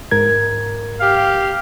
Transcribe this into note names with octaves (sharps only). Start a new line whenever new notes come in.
G#2 A#4 G#6
G4 F5